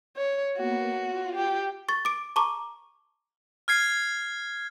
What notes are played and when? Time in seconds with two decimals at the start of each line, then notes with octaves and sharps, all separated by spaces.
0.16 C#5
0.58 A#3 B3 F#4
1.06 F4
1.35 G4
1.89 C#6 A6
2.05 D6 D7
2.36 A5 A#5 C#6 D6
3.68 F6 G#6 C7